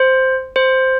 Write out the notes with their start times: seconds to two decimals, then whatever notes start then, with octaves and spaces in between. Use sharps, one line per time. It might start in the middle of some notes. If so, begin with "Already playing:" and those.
Already playing: C5
0.56 C5